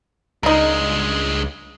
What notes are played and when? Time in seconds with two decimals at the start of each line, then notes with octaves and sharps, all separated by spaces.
0.43 C#2 G2 G#3 D#4 A#4